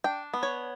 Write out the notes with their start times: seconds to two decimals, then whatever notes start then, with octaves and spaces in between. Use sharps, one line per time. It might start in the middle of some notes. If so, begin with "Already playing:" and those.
0.04 D4 G5
0.34 B3
0.43 C#5